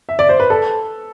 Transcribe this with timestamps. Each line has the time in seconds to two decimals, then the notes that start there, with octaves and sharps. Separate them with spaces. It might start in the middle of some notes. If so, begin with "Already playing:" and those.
0.09 E5
0.19 D5
0.29 C5
0.40 B4
0.50 A4